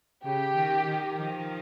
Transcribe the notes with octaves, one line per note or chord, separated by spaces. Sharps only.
C#3 G4
D#3
D#3
D#3 F3